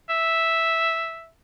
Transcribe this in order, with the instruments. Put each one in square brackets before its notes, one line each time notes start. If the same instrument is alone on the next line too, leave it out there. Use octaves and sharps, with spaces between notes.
[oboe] E5